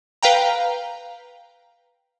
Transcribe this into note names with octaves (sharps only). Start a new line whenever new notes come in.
B4 F5 G5 A#5